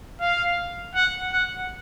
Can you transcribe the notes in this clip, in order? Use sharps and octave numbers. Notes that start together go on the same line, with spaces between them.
F5
F#5
F#5